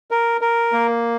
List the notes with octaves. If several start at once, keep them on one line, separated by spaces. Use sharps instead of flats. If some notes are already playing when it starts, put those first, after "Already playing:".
A#4
A#4
A#3